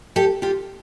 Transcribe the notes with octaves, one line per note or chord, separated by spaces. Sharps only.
G4 A4
F4 G4